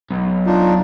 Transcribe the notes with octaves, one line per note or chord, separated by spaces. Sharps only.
B1
D4 D#4 F4